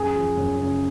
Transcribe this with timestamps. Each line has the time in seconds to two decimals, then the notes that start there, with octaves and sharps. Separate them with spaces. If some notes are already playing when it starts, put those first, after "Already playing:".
Already playing: F#2 G#4
0.15 F3
0.37 F#2
0.59 C#3